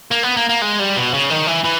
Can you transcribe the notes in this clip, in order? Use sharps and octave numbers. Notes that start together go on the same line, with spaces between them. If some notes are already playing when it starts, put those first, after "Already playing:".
A#3
B3
A#3
A#3
G#3
G3
B2
C#3
D#3
E3
E3